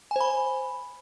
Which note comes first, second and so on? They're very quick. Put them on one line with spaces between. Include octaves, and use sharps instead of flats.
G#5 C5 B5